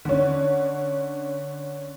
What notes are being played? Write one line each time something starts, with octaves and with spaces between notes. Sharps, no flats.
D3 C#4